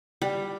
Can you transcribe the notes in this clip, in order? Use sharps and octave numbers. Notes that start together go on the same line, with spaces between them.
G3